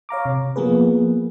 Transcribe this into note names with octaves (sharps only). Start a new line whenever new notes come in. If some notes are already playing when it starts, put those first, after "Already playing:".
C#5 F5 A#5 D6
C3
F3 A#3 B3 G#4 B4